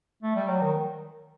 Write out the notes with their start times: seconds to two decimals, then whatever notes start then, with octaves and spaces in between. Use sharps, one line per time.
0.22 A3
0.35 G3
0.48 F#3
0.61 D#3